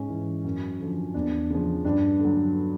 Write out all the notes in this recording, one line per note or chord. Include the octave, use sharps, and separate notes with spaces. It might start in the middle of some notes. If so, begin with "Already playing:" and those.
Already playing: G#2 C#4
E3
F#2
D3 F3
E2 D4
C#3 F3
G2 D4
D3
F#3